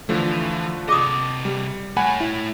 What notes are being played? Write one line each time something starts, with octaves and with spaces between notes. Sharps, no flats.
D3 E3 F3 A3
C3 G#4 D#5 D6 D#6
G3
A3 C#5 F#5 G#5 B5
E4